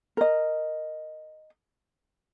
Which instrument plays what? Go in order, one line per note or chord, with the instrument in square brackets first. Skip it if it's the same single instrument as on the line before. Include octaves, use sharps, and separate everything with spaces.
[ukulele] A#4 D#5